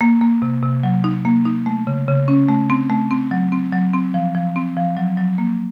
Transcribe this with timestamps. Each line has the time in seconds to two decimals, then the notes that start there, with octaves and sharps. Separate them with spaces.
0.01 A#3
0.21 A#3
0.42 C3
0.63 C3
0.83 F#3
1.04 D#4
1.25 A#3
1.46 D#4
1.66 A3
1.87 C#3
2.08 C#3
2.28 C#4
2.49 A3
2.70 C4
2.90 A3
3.11 C4
3.31 F#3
3.52 C4
3.73 F#3
3.93 C4
4.14 F3
4.35 F3
4.56 C4
4.76 F3
4.97 F#3
5.18 F#3
5.38 A#3